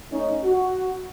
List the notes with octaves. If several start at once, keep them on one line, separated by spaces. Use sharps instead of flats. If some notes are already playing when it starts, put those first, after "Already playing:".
A3 C#4 D#4
F#4